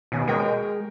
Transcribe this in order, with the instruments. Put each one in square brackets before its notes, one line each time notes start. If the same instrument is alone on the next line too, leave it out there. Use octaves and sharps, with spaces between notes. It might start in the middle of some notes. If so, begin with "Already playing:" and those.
[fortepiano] D#2 C#4 G#5 [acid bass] B2
[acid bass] G#3 [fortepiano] A#4 G5 C#6